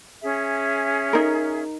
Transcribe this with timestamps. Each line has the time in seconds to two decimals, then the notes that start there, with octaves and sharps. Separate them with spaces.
0.22 C#4 G#4 E5
1.13 D#4 A#4